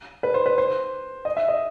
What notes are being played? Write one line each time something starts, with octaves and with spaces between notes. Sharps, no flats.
B4
C5
B4
C5
D#5
E5
D#5